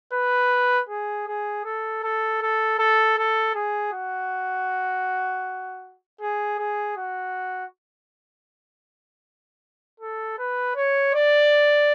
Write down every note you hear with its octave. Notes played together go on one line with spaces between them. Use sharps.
B4
G#4
G#4
A4
A4
A4
A4
A4
G#4
F#4
G#4
G#4
F#4
A4
B4
C#5
D5